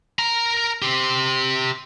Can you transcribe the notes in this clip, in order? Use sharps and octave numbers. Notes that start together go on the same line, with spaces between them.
A#4 A#5
G4 C5